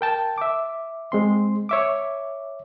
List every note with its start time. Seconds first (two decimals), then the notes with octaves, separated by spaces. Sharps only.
0.01 A#4 G5 A5
0.38 E5 D6
1.12 G#3 C4 C6
1.69 C#5 E5 D6